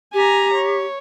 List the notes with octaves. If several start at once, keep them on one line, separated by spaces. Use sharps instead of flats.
G4 G#5 A#5
C#5